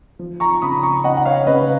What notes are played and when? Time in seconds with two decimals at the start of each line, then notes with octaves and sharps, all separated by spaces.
0.19 F3
0.40 A#5 C#6
0.62 C#3 B5 D#6
0.83 A#5 C#6
1.04 C#3 D#5 F#5
1.17 F#5
1.25 C#5 F5
1.47 C#3 B4 D#5